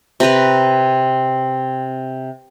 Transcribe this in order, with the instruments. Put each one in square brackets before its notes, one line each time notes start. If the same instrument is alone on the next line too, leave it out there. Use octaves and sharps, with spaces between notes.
[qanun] C3 C4 B4 A#5